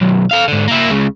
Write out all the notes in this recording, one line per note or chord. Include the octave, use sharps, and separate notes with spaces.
B1 F#2
A4 F5
G#2 D3
A#3 E4
C#2 C#3